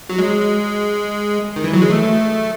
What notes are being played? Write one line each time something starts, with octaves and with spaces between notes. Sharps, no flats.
F#3
G#3
D#3
E3
F#3
G#3
A3